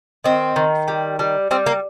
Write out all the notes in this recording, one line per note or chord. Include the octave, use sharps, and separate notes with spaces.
D#3 C4
D#3
G3
G3
G3 C4
A#3